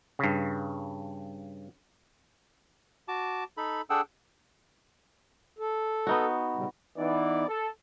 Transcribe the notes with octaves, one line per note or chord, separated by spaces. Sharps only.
G2 C#3
F#4 A5 D6
D#4 A4 B5
D4 G#4 A4 F#5 G5 E6
A4
B3 D#4 F#4
A#2 C#3 G3
E3 B3 D#4 D5
A4